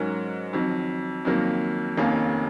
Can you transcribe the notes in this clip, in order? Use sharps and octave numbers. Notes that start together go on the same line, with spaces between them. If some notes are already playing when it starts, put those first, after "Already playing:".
Already playing: G#2 F#3 C#4 F#4 A#4
F2 D#3 F#3
F2 D#3 F#3 A#3
F1 D#2 D#3 A#3 C#4